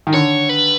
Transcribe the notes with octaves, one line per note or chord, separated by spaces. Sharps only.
D#3
D3 C#5
B4